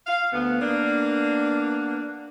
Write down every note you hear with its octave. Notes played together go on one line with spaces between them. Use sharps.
F5
D2 B3
A#3 B3 D4